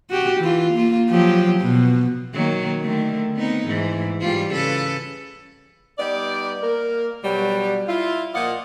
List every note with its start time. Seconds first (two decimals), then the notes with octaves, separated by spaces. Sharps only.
0.10 F#4 G4
0.40 E3 F4
0.74 A#3 F4
1.10 F3 F#3 G4
1.60 B2
2.34 D#3 F#3 A#3
2.81 D3 D#3 A3
3.37 B3 C4 D#4
3.66 G#2 E3
4.21 G#2 G3 F4
4.52 C#3 A4 B4
5.98 G3 B3 D#4 D5
6.62 A#3 A#4
7.23 B2 F#3 G3
7.88 E4 F4
8.34 A#2 F3 D5 D#5 F5 F#5